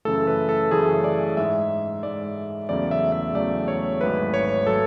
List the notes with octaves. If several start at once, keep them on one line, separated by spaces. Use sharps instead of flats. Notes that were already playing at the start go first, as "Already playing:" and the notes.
F#2 C#3 E3 A3 A4
B4
A4
F#2 C#3 E3 A3 G#4
D5
G#2 G#3 E5
G#2 G#3 D5
E2 C#3 F#3 A3 D5
E5
E5
E2 C#3 F#3 A3 D5
C#5
G#1 G#2 F#3 A3 B4
C#5
F#3 A3 A4